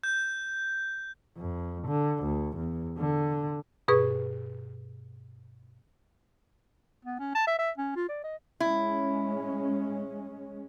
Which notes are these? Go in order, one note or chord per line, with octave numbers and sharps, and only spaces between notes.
G6
F2
D3
D2
E2
D3
G2 B2 G#4 B4 C#6
B3
C#4
A5
E5
E5
C#4
F4
D5
D#5
G#3 C#4 E4